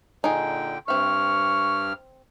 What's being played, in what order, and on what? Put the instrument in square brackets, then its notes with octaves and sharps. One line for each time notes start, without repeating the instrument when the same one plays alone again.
[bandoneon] A#2 D3 G5 [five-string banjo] D#4 G#4
[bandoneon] G2 F6 [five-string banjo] C4 E5 [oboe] C#6